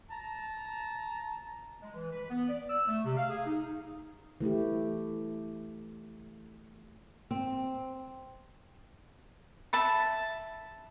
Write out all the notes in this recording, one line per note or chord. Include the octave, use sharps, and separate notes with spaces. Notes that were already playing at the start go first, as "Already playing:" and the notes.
A5 A#5
G#3
E3
B4
B3
D5
E6
A3
C3
F5
G#4
D#4
E3 A3 E4 G4
C4
E5 A5 B5